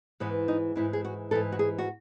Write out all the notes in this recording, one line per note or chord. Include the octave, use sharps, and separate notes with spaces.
G#2 E3 B3
D#4
G#2 E3 E4
G#4
F#4
G#2 E3 A4
F#4
G#4
F#4